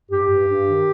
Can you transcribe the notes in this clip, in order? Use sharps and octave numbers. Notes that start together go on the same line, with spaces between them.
G2 G4
G2
G2
D#3